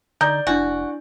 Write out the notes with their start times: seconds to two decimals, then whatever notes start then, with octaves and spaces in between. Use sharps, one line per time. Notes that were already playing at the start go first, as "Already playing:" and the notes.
0.21 D3 D#4 D5 G6
0.47 F1 D4 E4 F#4 G#5